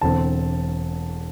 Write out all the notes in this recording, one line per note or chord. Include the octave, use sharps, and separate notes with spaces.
E1 E2 D3 C4 A5